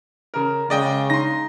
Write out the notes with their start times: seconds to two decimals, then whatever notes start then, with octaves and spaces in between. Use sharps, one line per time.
0.34 C#3 A#4
0.70 C#3 G#3 D5 D#5 G5
1.10 D#4 C6 A#6